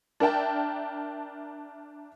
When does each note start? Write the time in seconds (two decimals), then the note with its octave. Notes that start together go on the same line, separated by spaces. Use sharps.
0.20 D4 A#4 E5 G5 A5